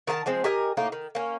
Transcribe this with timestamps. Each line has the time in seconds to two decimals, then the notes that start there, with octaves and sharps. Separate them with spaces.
0.07 D#3 A#4 D#5 A5
0.26 F3 G#3 C4
0.44 G4 A#4 D#5 G#5
0.77 A2 A#3 D#4
0.92 D#3
1.15 A#3 C#4